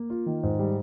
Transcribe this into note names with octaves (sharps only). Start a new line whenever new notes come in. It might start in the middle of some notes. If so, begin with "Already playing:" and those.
Already playing: A#3
F4
D#3
G#2
G3